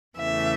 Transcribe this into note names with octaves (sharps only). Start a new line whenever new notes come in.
E2 C#3 E3 A3 E5